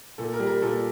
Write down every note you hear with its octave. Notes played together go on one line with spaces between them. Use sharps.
A#2 A4
A#4
G3
A#4
A#2 A4